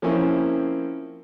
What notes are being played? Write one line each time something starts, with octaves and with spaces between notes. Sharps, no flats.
F3 A#3 C4 C#4 E4